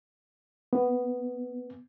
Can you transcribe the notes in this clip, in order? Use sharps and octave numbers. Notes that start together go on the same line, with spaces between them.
B3